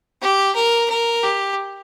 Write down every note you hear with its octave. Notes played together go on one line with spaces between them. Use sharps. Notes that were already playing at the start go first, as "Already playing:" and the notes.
G4
A#4
A#4
G4